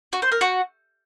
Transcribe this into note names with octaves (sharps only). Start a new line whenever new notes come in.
F#4
C5
A#4
F#4